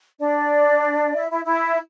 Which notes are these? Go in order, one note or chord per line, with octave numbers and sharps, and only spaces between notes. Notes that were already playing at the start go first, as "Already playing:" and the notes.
D4 D5
E4 E5
E4 E5
E4 E5